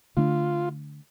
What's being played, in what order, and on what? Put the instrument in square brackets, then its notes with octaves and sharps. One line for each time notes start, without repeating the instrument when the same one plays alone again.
[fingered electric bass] D3 A3 D4 [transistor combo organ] F4